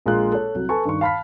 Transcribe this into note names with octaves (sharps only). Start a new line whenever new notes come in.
A#1 G#3 A#3 F4 G#4 F#6
A4 C#5
C2 F#3
A4 B4 G#5 A5 C#6
G2 D#3 C#6
F5 A5 B5 F6 B6